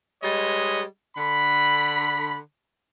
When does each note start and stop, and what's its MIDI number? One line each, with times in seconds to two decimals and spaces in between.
0.23 0.83 55
0.23 0.83 56
0.23 0.83 71
0.23 0.83 73
0.23 0.83 75
1.16 2.37 50
1.16 2.37 83